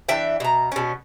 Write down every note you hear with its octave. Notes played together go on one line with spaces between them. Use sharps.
E3 D4 E5 G5
B2 A#5
B2 C#4